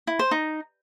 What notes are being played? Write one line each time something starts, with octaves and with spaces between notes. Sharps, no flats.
E4
C5
D#4